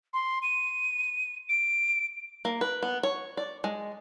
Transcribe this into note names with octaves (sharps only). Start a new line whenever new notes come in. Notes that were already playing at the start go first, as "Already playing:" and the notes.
C6
D#7
D7
A#3
B4
B3
C#5
D5
G#3